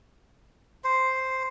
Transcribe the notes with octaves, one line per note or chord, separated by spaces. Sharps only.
C5